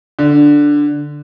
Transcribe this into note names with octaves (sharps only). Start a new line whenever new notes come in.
D3